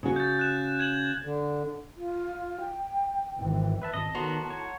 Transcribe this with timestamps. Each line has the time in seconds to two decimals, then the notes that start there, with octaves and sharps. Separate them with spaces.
0.03 C#3 F#4
0.16 G6 A6
0.39 F#6 E7
0.79 G#6 E7 F#7
1.22 D3
1.97 F4
2.60 G5
3.38 G#1 E3
3.82 B4 E5 A5
3.94 G#1 D#5 A5
4.15 A2 D#3 B3 F#4 A#5 C6
4.50 C#5 A5
4.63 F#5